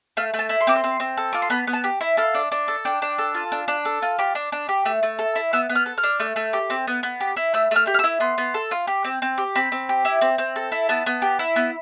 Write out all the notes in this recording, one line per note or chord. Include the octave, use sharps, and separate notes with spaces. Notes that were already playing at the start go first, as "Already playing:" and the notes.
A3 F5
A3
A5
E4
C6
C4 D6
C6
C4
C4
A4
F4 D6
C6
B3 B5
B3
A5
G4
E4
A4 F5
D4
D4
A4
D4 G5
D4
A4
F4
D4
D4
A4
F4
G4 D6
D4
D4
G4
A3
A3
A4
E4
B3 E6
B3
F6
A4
F6
D4
A3
A3
G4
C4
B3
B3
G4
E4
A3 E6
A3 F6
G4
F6
E6
E4
B3 C6
B3
A4
F4
G4
C4
C4
G4
C4 B5
C4
G4
E4
C4
C4
A4
E4
B3 A5
B3
G4
E4
B3